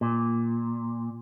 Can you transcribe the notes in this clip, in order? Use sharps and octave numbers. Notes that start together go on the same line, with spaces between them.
A#2